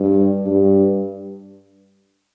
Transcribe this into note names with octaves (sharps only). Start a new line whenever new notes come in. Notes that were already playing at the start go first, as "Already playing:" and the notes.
Already playing: G2
G2